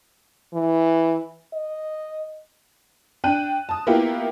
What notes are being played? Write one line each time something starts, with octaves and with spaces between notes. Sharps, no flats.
E3
D#5
D4 G5 F#6 D#7
A5 D#6
A#3 B3 E4 F4 G4